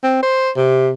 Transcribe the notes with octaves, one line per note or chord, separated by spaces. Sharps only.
C4
C5
C3